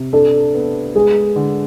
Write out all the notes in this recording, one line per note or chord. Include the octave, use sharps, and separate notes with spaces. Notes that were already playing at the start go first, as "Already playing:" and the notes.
Already playing: C3
D4 A4
B3
G#3 G#4
D3